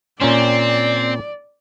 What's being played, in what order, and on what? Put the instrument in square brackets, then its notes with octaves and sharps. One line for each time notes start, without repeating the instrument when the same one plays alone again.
[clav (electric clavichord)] A#2 C#4 [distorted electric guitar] C4 [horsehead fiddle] D5